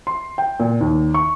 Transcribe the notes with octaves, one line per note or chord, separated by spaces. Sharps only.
C6
G5
A#2
D#2
C#6